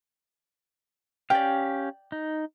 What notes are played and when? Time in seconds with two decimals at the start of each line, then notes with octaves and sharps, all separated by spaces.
1.30 C#4 G4 D5 F5 G5
2.12 D#4